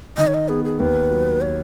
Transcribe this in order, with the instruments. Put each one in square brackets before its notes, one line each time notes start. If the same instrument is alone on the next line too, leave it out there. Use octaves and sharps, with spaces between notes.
[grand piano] D#3 [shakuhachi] D#5
[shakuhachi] C#5
D#5
[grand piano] B3 [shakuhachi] G#4
[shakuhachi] G#4
[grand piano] D#2 [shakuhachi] B4
[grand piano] F#3
[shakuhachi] C#5